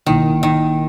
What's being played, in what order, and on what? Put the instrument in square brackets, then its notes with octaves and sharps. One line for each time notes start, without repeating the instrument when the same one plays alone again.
[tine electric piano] B1 B2 A#3 E4 A#4 [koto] D#3
[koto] D#3